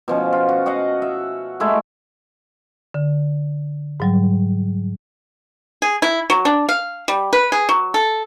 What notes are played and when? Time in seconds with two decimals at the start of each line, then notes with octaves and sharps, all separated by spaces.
0.08 B2 F3 C#4
0.33 F4
0.49 F#4
0.66 F#4 D#5 F5 F#5
1.02 E5
1.60 G#3 A3 E4
2.94 D3
4.00 G#2 F#3 G3
5.82 G#4
6.02 E4
6.30 F#3
6.45 D4
6.69 F5
7.08 G3
7.33 B4
7.52 G#4
7.69 F#3
7.94 A4